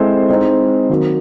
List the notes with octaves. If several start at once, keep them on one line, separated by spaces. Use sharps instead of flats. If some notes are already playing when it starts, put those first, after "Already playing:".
Already playing: G#3 C4 E4 A4 C5
G#3 C4 D#4
D#3 F#3 A#3